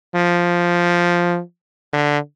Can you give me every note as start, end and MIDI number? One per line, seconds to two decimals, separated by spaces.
0.15 1.40 53
1.93 2.18 50